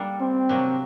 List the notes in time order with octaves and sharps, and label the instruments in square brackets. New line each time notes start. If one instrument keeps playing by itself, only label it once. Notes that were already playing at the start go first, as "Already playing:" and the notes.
Already playing: [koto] G3 A#3 D4 A4
[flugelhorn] C4
[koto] C3 F#3 A#3 D4